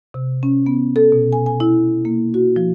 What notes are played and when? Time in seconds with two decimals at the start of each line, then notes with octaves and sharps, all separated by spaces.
0.14 C3
0.43 C#4
0.66 B3
0.96 A4
1.12 B2
1.33 G#5
1.46 G#5
1.60 E4
2.05 A#3
2.34 F#4
2.56 F3